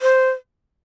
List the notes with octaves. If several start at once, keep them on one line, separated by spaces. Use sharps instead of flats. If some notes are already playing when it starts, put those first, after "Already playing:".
C5